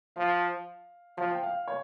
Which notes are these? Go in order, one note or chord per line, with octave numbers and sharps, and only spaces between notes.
F3 F5
F3 F5
G5
F5
C#5